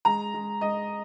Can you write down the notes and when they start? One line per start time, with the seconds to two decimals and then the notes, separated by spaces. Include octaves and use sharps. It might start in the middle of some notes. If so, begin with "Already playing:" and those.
0.05 G#3 A#5
0.34 G#3
0.61 G#3 D#5